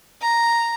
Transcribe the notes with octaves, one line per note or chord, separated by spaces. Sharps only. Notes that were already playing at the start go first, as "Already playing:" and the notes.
A#5